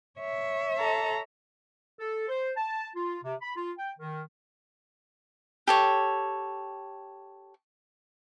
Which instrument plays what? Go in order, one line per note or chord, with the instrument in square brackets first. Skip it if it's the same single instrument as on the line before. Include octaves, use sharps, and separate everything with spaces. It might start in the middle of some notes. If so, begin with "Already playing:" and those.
[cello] C#5 E5
[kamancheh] A4 A#5
[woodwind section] A4
C5
A5
F4
C3
B5
F4
G5
D#3
[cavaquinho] G4 A4 C#5